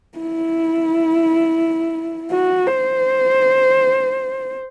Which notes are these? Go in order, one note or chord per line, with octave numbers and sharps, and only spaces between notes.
E4
F#4
C5